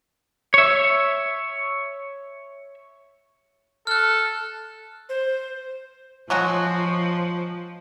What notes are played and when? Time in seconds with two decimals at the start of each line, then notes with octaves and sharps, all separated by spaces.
0.54 C#5 E5
3.87 A4 F6 F#6
5.09 C5
6.30 F3 F#3 G#3 F#4